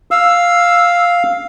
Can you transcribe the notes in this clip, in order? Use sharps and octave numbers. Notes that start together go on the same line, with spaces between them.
F5 E6